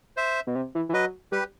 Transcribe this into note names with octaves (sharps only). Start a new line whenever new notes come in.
C5 E5
B2
C3
E3
E3
F#3 B4 D#5
G3 G4 B4